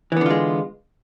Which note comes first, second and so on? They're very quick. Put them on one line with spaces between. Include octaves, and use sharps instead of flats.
E3 B3 D3 F4 G#3